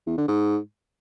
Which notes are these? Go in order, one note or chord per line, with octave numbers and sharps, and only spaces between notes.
E2
D3
G#2